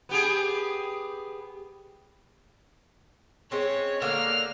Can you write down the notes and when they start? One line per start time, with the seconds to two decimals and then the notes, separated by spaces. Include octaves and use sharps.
0.09 B3 G4 G#4
3.51 G#3 C4 C#4 C#5
4.02 D3 G#3 A#3 F6